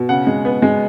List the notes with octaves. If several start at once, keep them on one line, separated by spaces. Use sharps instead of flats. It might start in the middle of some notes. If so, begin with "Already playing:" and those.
Already playing: B2
C#3 F#5
G#3
B3
G#3